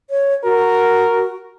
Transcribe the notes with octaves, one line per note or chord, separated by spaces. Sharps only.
C#5
F#4 A#4